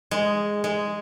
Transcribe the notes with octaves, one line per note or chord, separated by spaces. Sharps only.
G#3
G#3